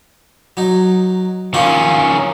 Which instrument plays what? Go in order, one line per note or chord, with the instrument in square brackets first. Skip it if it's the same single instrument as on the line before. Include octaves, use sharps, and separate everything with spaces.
[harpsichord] F#3 D#4
[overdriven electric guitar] D#3 C#4 [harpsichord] A#3 F4